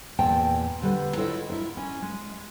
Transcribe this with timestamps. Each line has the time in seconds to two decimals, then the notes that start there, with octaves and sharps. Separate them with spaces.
0.19 E2 A#2 A#4 G5 A5
0.82 D3 G3 B4
1.16 E4 F4 A4 C#5 D#5
1.50 E4 A#4
1.77 C#4
2.02 G#3